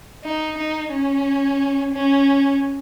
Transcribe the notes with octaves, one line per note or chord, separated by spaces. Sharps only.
D#4
D#4
C#4
C#4